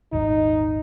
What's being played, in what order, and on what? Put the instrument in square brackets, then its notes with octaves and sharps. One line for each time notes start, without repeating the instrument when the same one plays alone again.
[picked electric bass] D#1 G#1 [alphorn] D#4